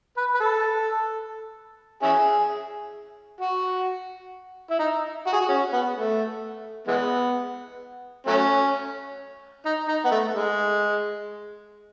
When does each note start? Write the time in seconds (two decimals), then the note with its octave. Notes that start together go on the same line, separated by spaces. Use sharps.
0.17 B4
0.35 B4
0.40 A4
2.02 C#4 E4 G#4
3.40 F#4
4.71 E4
4.79 D#4
5.27 F#4
5.33 G#4
5.40 F#4
5.48 C#4
5.73 B3
5.95 A3
6.87 E3 G#3 B3
8.27 F#3 A3 C#4
9.65 D#4
9.88 D#4
10.05 B3
10.11 A3
10.35 G#3